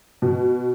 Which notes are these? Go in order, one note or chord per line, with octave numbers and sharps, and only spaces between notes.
B2